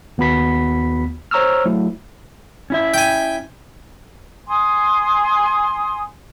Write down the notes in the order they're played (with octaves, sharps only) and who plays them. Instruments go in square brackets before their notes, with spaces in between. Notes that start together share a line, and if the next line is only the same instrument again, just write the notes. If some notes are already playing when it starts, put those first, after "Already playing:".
[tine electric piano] D#2 B3 F#4 B5 B6
C5 C#5 A#5 C#6 E6 F6
F#3 A3 E4
[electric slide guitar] C#4 E4 E5
[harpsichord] G5 G#5
[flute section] G#5 C6 D#6